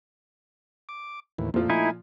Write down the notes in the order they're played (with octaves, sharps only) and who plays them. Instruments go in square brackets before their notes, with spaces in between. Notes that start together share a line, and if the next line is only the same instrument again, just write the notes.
[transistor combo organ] D6
D#2 A2 E3
[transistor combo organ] F2 A3 [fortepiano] A#2 F3
[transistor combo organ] A3 G#5 [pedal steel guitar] D#4 E4